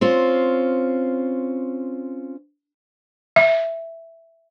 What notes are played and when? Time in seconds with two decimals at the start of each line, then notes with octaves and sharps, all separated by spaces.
0.01 C4 C#4 F4
3.36 E5